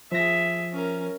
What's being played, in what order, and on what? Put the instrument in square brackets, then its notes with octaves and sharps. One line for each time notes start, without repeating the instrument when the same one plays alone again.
[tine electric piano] F3 A#6 [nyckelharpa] G#4 E5
[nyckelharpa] C#4 A#4